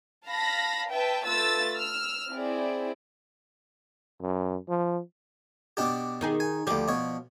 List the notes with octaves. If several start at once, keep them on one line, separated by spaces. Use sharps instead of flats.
F5 A5 B5 A#6
B4 E5 G5 A5
A3 F4 B4 E6 A6
E6 F6
C4 E4 G#4 D5
F#2
F3
B2 D4 G4
D#3 D#4 G#4
G#5
D2 F3 G4 D5
B2 C#5